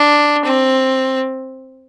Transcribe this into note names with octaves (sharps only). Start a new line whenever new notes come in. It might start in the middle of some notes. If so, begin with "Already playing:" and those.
Already playing: D4
C4